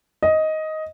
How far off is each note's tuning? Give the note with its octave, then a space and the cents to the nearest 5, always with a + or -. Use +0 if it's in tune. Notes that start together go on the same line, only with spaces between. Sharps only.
D#5 +10